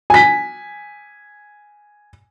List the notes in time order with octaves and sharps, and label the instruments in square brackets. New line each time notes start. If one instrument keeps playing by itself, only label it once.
[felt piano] G#5 B6